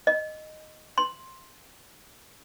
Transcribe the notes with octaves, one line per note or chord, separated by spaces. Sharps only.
D#5
C6